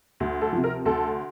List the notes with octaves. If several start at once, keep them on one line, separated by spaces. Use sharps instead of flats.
D2
A4
C3 F3
A#4
D2 A4